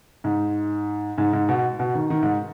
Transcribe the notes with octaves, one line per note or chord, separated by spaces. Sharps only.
G#2
G#2
G#2
B2
B2
D#3
D#3
G#2